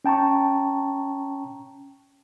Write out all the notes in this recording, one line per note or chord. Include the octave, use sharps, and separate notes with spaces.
C#4 G5 A5 A#5 C#6